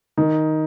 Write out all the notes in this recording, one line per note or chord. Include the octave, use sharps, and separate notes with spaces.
D#3